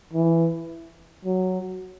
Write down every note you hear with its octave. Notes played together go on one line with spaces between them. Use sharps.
E3
F#3